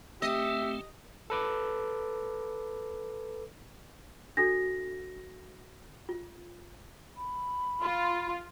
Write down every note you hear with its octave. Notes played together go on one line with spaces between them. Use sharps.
A3 C4 G4 D#5 E5
A4 B4 D6
D4 F#4 A4 A#6
F4
B5
F4